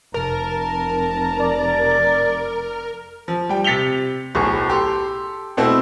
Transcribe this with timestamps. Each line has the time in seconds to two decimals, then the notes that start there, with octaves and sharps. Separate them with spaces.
0.14 F1 A#4 A5
1.40 D5
3.28 F3
3.49 G3 G5
3.64 C3 A6 B6 C#7 F7 G7
4.35 D1 B1 A2 G#4 C#6
4.69 G4 A4 C6
5.57 B2 A3 C4 E4